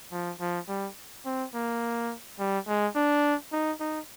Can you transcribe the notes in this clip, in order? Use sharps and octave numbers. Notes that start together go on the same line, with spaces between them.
F3
F3
G3
C4
A#3
G3
G#3
D4
D#4
D#4